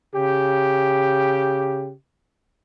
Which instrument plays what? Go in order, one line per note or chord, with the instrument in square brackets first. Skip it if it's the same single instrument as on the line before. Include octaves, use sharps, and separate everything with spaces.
[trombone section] C#3 G4